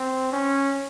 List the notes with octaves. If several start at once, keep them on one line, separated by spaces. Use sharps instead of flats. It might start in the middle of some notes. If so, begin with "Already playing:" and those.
Already playing: C4
C#4